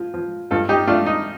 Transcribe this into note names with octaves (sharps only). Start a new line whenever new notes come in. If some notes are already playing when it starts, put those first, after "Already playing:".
Already playing: F3
F3
G2 F4 A4
D#4 G4
A3 D4 F4
D#4